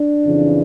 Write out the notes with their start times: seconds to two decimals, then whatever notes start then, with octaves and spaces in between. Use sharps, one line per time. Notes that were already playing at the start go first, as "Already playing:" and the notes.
Already playing: D4
0.23 F2 C#3 E3